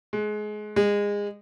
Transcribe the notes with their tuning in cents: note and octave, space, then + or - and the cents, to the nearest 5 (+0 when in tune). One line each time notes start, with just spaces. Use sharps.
G#3 +25
G#3 -25